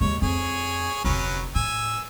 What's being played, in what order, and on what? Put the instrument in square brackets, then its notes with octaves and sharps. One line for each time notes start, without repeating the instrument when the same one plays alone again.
[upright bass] D#2 G#3 [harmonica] C#5
[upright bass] F2 [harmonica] G#4 C#5
[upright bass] F1 D2 [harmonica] F#3 C#4 B4
[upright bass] A2 [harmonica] G#5 E6